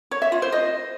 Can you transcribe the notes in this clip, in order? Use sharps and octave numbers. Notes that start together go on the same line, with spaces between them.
C#5
E5
F4
C5
D#5